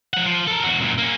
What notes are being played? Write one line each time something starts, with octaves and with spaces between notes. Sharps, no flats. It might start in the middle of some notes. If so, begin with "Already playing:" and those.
F3 F#5
F3
A4 A#4
E2 F#4
F#2 A#2
A#3 C#4